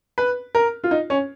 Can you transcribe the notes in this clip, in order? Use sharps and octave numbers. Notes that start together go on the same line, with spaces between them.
B4
A#4
F4
D#4
C#4